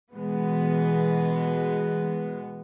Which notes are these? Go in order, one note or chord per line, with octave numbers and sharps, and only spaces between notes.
B2 E3 G#3 B3